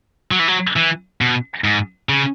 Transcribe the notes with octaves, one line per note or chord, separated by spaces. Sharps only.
F#3
E3
F#3
E3
B2
G#2
C#3